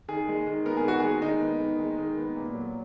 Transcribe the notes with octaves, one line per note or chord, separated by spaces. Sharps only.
D#3 G#4
G#3
D#3
B3 A#4
G#4
D#3 F#4
G#3 G#4
D#3 D#4
B3
D#3
G#3
D#3
B3
A#2
F#3